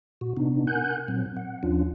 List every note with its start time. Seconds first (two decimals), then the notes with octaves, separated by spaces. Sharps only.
0.21 A#2 F#4
0.37 C3 B3 D4 D#4
0.67 A#4 F#5 G#5 F#6 G6
1.08 A#2 F#3 C4
1.37 F#5
1.63 D#2 F3 C#4 D4 F4